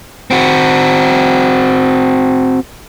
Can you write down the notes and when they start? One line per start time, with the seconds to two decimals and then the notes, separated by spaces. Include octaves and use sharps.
0.31 C4 F#4